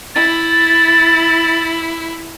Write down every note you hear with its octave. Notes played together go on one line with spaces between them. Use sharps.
E4 A6